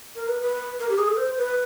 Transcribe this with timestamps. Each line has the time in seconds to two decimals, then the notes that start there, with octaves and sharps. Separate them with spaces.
0.15 A#4
0.27 B4
0.41 B4
0.79 A#4
0.89 G4
0.98 G#4
1.07 A4
1.17 C5
1.37 B4